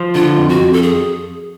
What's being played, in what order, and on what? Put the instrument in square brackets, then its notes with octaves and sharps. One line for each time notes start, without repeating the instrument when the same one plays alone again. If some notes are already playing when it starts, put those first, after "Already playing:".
Already playing: [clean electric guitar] F3
[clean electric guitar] D3 [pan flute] F4
[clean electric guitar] F2
[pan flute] F#4
[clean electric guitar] F2
[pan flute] A4
G#4